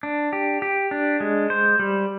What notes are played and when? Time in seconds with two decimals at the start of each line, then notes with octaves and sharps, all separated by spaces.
0.03 D4
0.33 G4
0.62 G4
0.91 D4
1.20 G#3
1.50 C5
1.79 G3